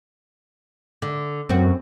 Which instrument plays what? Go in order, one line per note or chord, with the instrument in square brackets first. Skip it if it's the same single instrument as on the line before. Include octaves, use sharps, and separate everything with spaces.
[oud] D3
[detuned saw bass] F#2 [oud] C4 F#4